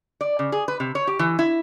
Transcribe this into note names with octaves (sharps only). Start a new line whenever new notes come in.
D5
C#3
G#4
B4
C3
C#5
G4
E3
E4